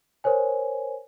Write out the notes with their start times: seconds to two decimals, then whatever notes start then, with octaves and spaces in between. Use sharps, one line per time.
0.24 A#4 C5 C#5 G#5